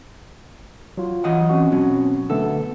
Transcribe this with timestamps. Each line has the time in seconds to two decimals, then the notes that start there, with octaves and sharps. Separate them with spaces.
0.97 F#3 F4
1.24 E3 D#5 F#5
1.49 C4 C#4 F#4
1.72 B2 F#3
2.30 D3 A3 B3 A4